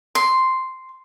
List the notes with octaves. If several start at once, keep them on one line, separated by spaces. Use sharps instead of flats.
C6